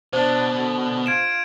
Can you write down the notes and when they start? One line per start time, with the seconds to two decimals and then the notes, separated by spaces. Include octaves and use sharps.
0.13 B2 D4 C5
0.56 D3
1.06 F4 G#6 D7 E7